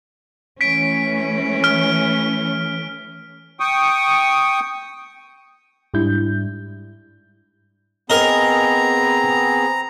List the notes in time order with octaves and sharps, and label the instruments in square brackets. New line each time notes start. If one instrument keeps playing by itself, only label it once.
[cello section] E3 A3 C#4 [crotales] B6 D7
[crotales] F6
[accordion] G5 C#6 D#6
[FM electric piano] G#2 G3 D4 E4 G6
[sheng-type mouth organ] B3 C4 G#4 [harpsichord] A#4 D#5 [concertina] A#5